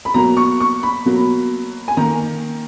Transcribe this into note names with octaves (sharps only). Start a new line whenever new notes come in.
B5
B2 F#3 A#3 A#5
C#6
C#6
B5
B2 F#3 A#3
G#5
D#3 A#3 A#5